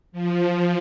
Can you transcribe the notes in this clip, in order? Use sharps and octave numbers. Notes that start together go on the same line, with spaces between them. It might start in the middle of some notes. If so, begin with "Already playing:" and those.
F3